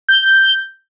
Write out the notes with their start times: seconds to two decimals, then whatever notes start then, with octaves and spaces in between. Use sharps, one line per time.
0.09 G6